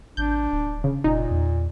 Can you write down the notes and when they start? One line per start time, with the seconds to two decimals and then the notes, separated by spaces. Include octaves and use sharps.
0.17 G#1 D4 G6
0.52 D1
0.84 C#3
1.04 F1 A#2 D#4
1.30 E2